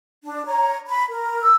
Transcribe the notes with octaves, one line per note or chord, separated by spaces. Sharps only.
D4
C#5 A#5
B5
A#4
E6